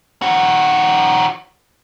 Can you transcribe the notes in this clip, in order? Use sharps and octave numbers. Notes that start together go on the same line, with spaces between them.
D#3 F#4